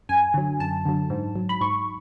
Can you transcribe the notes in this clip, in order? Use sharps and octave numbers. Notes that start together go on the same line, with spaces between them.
F#2 G#5
D3 F#3
F#2 A5
D3 F#3
G#2
F#3
B5
G#2 C#6